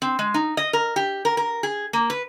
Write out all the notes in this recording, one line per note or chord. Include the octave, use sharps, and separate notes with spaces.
C4
G#3
D#4
D#5
A#4
G4
A#4
A#4
G#4
A#3
B4